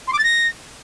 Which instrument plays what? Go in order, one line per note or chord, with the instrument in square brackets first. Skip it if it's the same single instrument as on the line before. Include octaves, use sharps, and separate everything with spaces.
[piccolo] C6
D6
A6
A#6